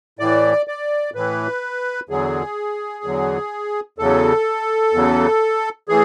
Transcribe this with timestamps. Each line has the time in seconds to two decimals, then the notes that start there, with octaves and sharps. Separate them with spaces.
0.19 A2 E3 D5
0.68 D5
1.14 A2 E3 B4
2.09 E2 D3 F#3 G#4
3.04 E2 D3 F#3
3.99 E2 C#3 F#3 A4
4.93 E2 C#3 F#3
5.88 A2 E3 G#4